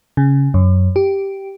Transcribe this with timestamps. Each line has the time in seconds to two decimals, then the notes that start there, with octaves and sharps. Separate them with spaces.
0.17 C#3
0.54 F#2
0.96 G4